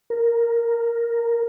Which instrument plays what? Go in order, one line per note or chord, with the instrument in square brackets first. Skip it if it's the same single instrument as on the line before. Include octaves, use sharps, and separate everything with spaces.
[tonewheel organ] A#4